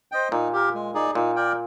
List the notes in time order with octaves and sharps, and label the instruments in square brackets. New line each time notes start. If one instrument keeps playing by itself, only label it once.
[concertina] C5 D#5 G5
[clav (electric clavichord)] A#2 [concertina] D#4
[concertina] G4 A#4
G#3
D#4 G#4 D5
[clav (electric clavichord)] A#2 [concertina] D#4
[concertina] A#4 D5 G5